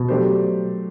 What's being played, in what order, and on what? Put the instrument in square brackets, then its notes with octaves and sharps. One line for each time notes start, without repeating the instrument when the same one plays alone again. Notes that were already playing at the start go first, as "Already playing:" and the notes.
Already playing: [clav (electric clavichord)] B2
[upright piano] F#3 A3 D4 G4 C5